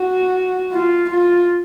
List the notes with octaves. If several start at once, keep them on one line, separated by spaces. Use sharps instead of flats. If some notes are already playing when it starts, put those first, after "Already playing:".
Already playing: F#4
F4
F4